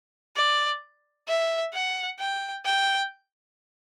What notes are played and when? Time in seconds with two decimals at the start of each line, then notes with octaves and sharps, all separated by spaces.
0.36 D5
1.28 E5
1.74 F#5
2.19 G5
2.65 G5